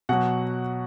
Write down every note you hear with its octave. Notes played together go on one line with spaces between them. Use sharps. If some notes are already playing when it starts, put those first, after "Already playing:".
B2 F#3 F#5